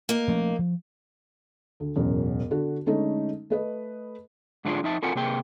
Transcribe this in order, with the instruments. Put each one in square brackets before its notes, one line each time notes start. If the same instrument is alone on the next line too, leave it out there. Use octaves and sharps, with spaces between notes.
[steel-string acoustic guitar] A#3 D#4
[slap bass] F3 A3 C#4
F3
[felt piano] D2
E1 A1 F#2
D3 F#4
D3 G#3 A3 C#4 D#4
A3 B4 D#5
[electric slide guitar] G#2 D3 A3 D4 F4 G#4
F2 D#4 E5 A5
C4 F4 A4 A#4 F#5 G#5
C3 A#3 G#4 G5